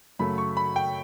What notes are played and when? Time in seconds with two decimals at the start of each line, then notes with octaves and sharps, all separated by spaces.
0.19 F#2 C#3 F#3 A3 B5
0.38 C#6
0.57 B5
0.76 G5